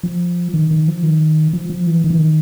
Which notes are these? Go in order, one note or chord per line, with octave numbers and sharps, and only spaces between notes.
F3
D#3
D#3
F3
D#3
F3
F3
E3
D#3
E3
D#3